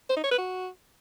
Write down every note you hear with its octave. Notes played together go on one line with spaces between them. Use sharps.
C5
D#4
C#5
B4
F#4